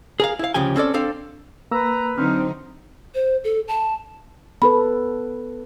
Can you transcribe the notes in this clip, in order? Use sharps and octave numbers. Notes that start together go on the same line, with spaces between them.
G#4 A#4 F5
E4 F5
D2 C#3 F3 G4 G#5
C4 C#4 A4 D5
C4 D4 A4 F5
A#3 B4 A#5 E6
D3 F#3 C4 D#4 F6
C5
A4
A5
B3 A4 B4 B5